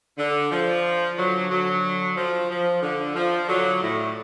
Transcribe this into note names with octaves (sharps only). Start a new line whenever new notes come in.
D3
F3
D3 F#3
D3 F#3
F3
F3
D3
F3
D3 F#3
A2